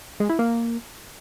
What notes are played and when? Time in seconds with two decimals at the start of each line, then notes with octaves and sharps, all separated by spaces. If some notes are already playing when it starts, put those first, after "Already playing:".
0.20 G#3
0.29 E4
0.39 A#3